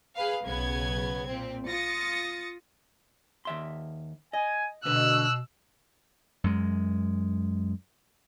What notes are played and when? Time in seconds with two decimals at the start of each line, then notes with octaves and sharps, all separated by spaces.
0.16 G#4 B4 F5
0.45 B1 C#3 B3 G#6
1.28 A#2 C4
1.68 F4 D#6 A6 A#6 C#7
3.45 D#2 E5 C6
4.33 D#5 G#5
4.85 D2 B2 D3 B4 E6 F#6
6.44 F#2 G#3